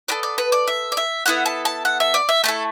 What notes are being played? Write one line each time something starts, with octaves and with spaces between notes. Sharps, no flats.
B3 F#4 A4 D5
D5
B4
D5
E5
D5
E5
B3 E4 A4 F#5
A5
A5
F#5
E5
D5
E5
A3 E4 A4 A5